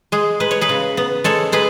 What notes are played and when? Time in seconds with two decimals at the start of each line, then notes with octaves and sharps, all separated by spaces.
0.12 G#3 G#4
0.40 G#3 B4
0.51 C#5
0.61 G#4 B4
0.69 C#3
0.97 B3
1.24 G#3 A4 C#5
1.52 G#3 G#4 B4